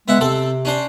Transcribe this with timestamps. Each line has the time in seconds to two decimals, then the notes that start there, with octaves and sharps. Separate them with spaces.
0.08 G#3 B3 E5 F#5
0.21 C3 C4 A4
0.65 C#4 D4 C5